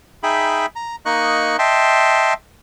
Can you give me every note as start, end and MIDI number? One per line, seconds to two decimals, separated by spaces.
0.23 0.66 63
0.23 0.66 68
0.23 0.66 76
0.23 0.66 79
0.23 0.66 83
0.76 0.96 82
1.05 1.57 58
1.05 1.57 63
1.05 1.57 75
1.05 1.57 85
1.05 1.57 90
1.59 2.34 75
1.59 2.34 76
1.59 2.34 79
1.59 2.34 81
1.59 2.34 84